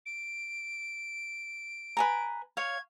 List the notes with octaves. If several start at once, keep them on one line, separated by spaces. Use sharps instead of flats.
D7
B4 G#5 A#5
C#5 F5 G#6